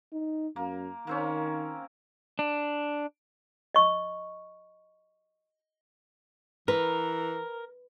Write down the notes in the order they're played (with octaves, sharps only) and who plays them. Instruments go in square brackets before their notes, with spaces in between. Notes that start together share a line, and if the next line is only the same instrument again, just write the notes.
[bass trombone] D#4
[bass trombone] F#2 [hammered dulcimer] A#3
[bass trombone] D#3 [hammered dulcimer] A#3 C4 C#4
[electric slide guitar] D4
[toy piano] D#5 C#6
[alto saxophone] E3 [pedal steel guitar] A#4 [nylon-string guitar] B4